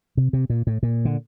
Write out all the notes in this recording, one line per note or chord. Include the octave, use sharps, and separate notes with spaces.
C3
C3
A#2
A2
A#2
D3